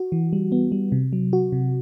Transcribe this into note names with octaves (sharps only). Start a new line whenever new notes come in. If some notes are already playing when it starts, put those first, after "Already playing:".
Already playing: F#4
E3
G3
B3
G3
C3
F#3
F#4
C3